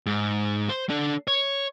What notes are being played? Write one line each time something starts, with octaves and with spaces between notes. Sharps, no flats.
G#2
C5
D4 A4
C#5